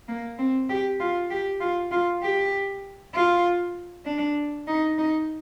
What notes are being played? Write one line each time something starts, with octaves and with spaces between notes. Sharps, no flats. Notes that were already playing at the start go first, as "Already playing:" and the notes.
A#3
C4
G4
F4
G4
F4
F4
G4
F4
D4
D#4
D#4